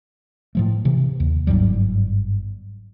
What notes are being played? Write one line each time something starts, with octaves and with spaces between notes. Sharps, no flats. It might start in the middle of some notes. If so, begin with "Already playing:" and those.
A2 F3 A3
C3 E3
D#2
G1 G#2 F#3 G3